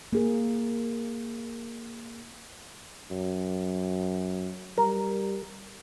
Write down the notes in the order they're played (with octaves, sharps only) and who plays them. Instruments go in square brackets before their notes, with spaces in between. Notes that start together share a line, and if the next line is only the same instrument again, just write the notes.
[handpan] A#3 G#4 A#4
[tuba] F#2
[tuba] G3 [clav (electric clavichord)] A#4